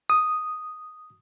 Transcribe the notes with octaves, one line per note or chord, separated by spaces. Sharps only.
D#6